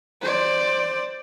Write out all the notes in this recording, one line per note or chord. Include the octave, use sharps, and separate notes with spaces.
C5 D5